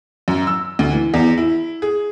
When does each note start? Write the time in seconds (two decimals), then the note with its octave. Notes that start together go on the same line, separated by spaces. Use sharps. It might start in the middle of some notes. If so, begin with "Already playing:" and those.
0.28 F#2
0.47 E6
0.79 D2
0.92 E3
1.14 E2
1.38 E4
1.82 G#4